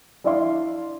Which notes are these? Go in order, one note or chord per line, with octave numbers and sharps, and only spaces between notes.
D4 E4 D5 E5 F5 C6